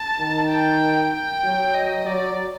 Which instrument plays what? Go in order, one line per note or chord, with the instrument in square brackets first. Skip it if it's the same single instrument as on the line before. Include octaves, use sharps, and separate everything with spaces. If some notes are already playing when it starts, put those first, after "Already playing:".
Already playing: [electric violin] A5
[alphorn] D#3
[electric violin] G5
G5
[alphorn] F#3
[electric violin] D#5
[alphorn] F#3 [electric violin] D5